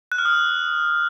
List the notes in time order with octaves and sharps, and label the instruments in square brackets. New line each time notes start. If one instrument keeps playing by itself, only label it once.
[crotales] F#6
F6
D#6